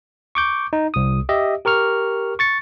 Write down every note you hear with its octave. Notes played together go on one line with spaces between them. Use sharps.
C#6 D6 G6
D#4
C2 D#6
G4 D#5 E5
G4 A#4 C#6 F6
C#6 A6 C#7